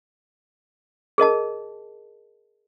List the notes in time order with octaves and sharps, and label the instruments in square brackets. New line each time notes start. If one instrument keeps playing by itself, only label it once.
[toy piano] G#4 A#4 D#5 A5